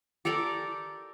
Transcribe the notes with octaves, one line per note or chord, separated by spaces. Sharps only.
G4 A4 A#4 D5